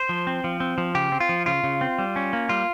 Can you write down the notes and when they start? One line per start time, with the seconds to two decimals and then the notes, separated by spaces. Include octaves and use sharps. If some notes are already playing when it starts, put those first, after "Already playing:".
Already playing: C5
0.09 F3
0.27 C4
0.44 F3
0.60 C4
0.78 F3
0.95 C#3 G4
1.12 C4
1.20 F4
1.29 F3
1.46 C#3 F4
1.64 C#3
1.81 C4
1.98 G3
2.16 C#4
2.33 A#3
2.49 G3 F4